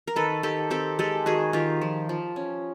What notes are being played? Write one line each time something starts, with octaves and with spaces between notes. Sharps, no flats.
A#4
D#3 A4 B4
D#3 G4 A4
C4 G4 A4
G#3 G4 A4
D#3 F#4 G#4
D#3 F4 G4
F3
F3
C#4